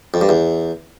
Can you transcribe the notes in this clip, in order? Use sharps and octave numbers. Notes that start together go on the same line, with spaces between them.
F2
G2
E2